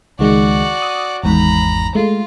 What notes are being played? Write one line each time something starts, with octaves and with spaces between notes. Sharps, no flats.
C#2 D#3 G#3 F#4 D5
D#6
G#1 E2 G#2 A#5 B5
G#3 A3 F4